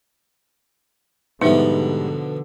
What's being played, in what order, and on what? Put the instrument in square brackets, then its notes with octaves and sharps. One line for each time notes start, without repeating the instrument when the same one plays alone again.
[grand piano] G#2 G3 [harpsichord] B2 F3 [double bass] D3 [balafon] D#4 C5 E5